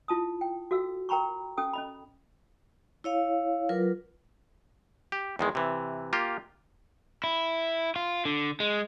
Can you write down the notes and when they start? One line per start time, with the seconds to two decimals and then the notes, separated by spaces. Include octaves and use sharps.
0.08 E4 F4 A5 D#6
0.41 G5
0.71 F#4 A4 F5 E6
1.09 A#4 G5 A#5 B5 C#6
1.57 C#4 A4 G5 D#6
1.73 C#4 D#5 B5
3.04 E4 C#5 F5
3.69 F#3 F4 A#4 B4
5.12 G4
5.39 E2 D#3 G#3
5.55 C3 E3
6.13 A#3 F4 G4
7.24 E4
7.96 F4
8.25 D3
8.60 G#3